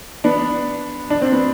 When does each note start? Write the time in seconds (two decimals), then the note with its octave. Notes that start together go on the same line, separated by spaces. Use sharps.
0.24 B3 D4
1.10 D4
1.22 C4
1.32 B3